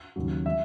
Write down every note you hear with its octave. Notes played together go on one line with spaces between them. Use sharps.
D#2 C#3 F#3
E3 G#3 E5